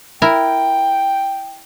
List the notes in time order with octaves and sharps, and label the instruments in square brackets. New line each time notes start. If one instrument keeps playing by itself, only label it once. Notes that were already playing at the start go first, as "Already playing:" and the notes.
[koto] E4 A#4 [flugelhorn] G5